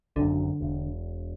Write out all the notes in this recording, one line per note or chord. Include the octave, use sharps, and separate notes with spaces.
G#1 F#2 D3
E1